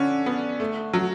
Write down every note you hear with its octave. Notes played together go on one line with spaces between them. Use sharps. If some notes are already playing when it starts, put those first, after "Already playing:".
Already playing: D3 C#4 D4
B3
A3
F#3